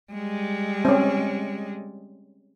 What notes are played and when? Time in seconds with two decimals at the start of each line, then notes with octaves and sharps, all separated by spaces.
0.12 G3 G#3
0.85 C4 C#4